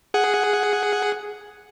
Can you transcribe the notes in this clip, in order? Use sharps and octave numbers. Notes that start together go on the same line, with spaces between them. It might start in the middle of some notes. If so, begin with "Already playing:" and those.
G#4 F#5